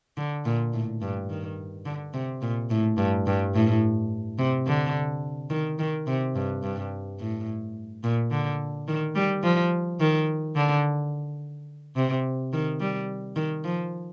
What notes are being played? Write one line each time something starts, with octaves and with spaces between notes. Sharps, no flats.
D3
A#2
A2
G2
D#3
D3
C3
A#2
A2
G2
G2
A2
C3
D3
D#3
D#3
C3
G2
G2
A2
A#2
D3
D#3
G3
F3
D#3
D3
C3
D#3
G3
D#3
F3